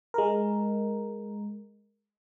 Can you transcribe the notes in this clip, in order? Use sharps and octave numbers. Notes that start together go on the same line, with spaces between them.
G#3 A#4